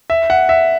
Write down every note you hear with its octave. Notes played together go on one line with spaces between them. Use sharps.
E5
F#5
E5